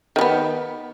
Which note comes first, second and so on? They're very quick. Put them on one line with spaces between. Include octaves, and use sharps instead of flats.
D#3 G3 B3